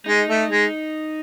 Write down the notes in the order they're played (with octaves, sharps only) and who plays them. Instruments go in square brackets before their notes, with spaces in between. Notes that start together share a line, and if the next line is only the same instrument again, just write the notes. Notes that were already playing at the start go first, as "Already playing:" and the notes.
[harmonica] G#3 [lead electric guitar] D#4
[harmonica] A3
G#3